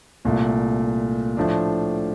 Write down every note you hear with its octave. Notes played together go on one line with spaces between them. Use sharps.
C2 A#2 A3
A2 F3 A3 D4